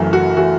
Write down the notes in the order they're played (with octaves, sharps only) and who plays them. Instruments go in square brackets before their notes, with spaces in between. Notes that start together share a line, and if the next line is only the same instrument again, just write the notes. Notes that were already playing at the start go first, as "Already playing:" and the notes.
Already playing: [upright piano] F#1 F#2 E3 A3
F#4
E3 A3 F#4